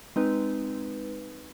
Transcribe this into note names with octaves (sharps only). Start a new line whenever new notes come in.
G#3 C4 D#4 B4